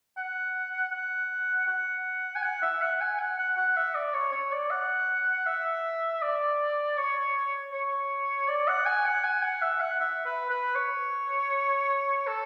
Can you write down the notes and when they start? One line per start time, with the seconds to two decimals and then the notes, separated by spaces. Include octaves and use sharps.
0.17 F#5
0.93 F#5
1.68 F#5
2.36 G#5
2.44 F#5
2.62 E5
2.82 F#5
3.01 G#5
3.19 F#5
3.38 F#5
3.57 F#5
3.77 E5
3.95 D5
4.14 C#5
4.32 C#5
4.52 D5
4.71 F#5
5.46 E5
6.22 D5
6.97 C#5
7.73 C#5
8.48 D5
8.68 F#5
8.86 G#5
9.06 F#5
9.24 G#5
9.43 F#5
9.62 E5
9.81 F#5
10.00 E5
10.26 B4
10.50 B4
10.75 C#5
12.27 A4